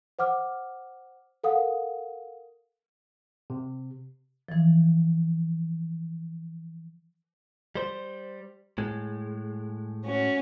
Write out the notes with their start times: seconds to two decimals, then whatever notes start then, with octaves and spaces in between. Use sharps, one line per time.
0.19 C5 F#5 D6 F6
1.44 A4 A#4 F5 F#5 D#6
3.50 C3
4.49 E3 F3
7.75 G3 C5
8.78 A2 G#3
10.03 C#4 F#4